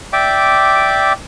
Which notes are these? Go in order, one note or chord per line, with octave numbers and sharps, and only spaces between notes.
D5 E5 G5 D6